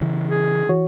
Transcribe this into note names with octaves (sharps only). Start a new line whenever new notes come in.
C#3 E3
G#4
E3 F#4 C#5